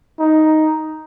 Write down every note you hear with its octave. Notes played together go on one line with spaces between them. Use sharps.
D#4